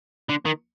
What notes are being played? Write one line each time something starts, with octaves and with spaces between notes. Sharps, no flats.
D3
D#3